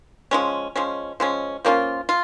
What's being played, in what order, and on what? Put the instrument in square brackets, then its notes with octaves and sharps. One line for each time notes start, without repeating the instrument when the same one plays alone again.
[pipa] F3 G#3 C#4
F3 G#3 C#4
F3 G#3 C#4
F3 A#3 C#4 F4
F4